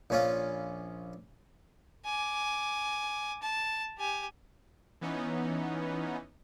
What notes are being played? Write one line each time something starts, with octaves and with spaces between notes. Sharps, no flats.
A#1 C#4 F4
G#5 D6
A5
G4 G#5
E3 B3 C#4 D#4